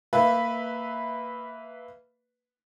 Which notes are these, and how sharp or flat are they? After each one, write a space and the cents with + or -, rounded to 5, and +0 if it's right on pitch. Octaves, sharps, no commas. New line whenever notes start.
A#3 -20 B4 +0 E5 -15